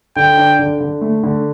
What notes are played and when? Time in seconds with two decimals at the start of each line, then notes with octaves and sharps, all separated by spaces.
0.16 D3 G5
0.37 D4
0.59 D3
0.80 D3
1.01 A3
1.23 D3